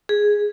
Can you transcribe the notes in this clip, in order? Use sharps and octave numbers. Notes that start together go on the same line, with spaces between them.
G#4